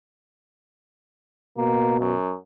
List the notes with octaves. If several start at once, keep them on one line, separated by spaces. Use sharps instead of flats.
B2 A#3
F#2